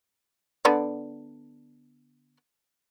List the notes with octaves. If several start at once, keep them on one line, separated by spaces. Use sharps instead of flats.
D3 B3 D5